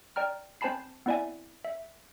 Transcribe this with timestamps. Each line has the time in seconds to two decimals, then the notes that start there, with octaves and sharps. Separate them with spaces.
0.16 D5 G5 A#5 F6
0.61 C4 C5 G#5 A5 B5 C7
1.06 B3 C4 E4 D5 E5 G#5
1.65 E5